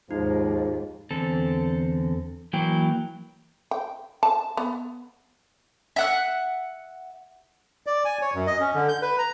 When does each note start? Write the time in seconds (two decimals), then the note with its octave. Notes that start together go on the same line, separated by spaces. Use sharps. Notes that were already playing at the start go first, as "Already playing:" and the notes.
0.11 D#2 G#2 F3 G#3 D#4
1.11 E2 D3 C4 A4
2.53 E3 F#3 A#3 E4 G5
3.71 G5
4.23 A5
4.57 B3
5.96 E5 F#5 F#6
7.87 D5
8.05 G#5
8.22 C#5
8.34 F#2
8.47 D#5
8.60 C#4
8.75 D3
8.88 G6
9.02 B4
9.18 A#5